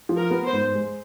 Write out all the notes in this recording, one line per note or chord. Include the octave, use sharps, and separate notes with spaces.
F3
A#4
B3
C5
G#2
G#3